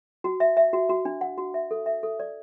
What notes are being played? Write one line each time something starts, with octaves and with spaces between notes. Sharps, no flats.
F#4
E5
E5
F#4
F#4
D4
F#5
F#4
E5
A4
E5
A4
D5